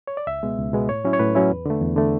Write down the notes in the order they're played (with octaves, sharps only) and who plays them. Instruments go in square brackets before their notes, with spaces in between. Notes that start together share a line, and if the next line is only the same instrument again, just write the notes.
[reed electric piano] C#5
D5
C#2 E5
B2 G#3 B3
C#2
B2 G#3 B3
A2 C#5
F#3 C#4 E4
C#5
A2 B4
F#3 C#4 E4
E2
D3 A3
E2
D3 A3